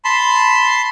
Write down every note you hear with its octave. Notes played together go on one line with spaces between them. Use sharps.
A5 B5 C6